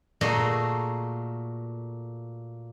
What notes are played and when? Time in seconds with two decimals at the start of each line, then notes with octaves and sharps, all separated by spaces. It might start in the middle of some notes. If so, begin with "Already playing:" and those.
0.21 A#2 A3 A#3 F#4 G#4 D#5